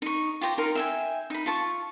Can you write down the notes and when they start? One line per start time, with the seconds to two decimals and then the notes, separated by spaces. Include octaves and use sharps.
0.02 D#4 C#6
0.41 F4 G4 C5 A#5
0.58 D#4 A#4 A#5 C6
0.75 E5 G5 G#5
1.30 D#4 B5
1.46 F4 A5 C#6